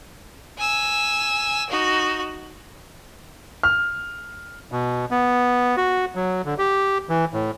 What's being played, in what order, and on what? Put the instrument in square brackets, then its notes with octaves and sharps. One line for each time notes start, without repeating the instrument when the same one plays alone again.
[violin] G#5 E6
D#4 F#4
[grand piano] F6
[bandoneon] B2
B3
F#4
F#3
D3
G4
E3
A2